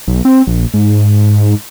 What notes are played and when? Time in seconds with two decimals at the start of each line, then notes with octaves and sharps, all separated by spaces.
0.08 B1
0.25 C4
0.47 A#1
0.74 G#2